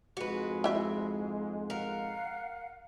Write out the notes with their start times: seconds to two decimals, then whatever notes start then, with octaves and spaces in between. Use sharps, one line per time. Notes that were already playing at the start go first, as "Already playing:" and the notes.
0.17 F2 G#2 G#3 F#4 B4
0.64 E4 E5
1.70 A#4 F5 F#5